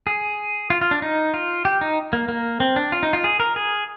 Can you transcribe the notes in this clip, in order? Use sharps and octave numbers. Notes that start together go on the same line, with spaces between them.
G#4
F4
F4
D4
D#4
F4
G4
D#4
A#3
A#3
C4
D4
F4
D#4
F4
G#4
A#4
G#4